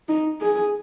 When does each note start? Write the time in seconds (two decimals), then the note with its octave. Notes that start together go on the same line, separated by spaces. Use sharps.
0.09 D#4
0.41 G#4